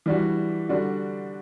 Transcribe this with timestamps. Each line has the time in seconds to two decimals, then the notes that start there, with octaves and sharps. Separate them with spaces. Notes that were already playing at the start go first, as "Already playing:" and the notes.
0.06 E3 G3 D4 F#4
0.69 D3 G3 D4 F#4